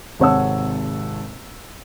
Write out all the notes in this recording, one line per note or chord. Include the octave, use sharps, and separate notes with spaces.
G#1 C3 C#5 F#5 A5 E6